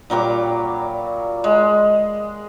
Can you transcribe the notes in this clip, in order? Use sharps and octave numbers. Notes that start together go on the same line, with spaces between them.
A#2 F#3 G3 D6
G#3